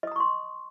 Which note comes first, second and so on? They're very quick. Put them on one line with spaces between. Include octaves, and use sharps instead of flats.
D#5 D#6 A#5 C#6 C6